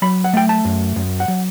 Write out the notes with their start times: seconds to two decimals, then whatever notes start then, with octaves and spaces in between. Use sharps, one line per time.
0.02 F#3 B5
0.24 F#5
0.33 A3 G5
0.49 A5
0.65 F#2
0.96 F#2
1.20 F#5
1.28 F#3